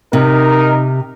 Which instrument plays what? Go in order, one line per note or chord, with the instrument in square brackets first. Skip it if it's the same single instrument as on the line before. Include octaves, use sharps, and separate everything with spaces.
[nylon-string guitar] C3 [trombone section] D#4 A#4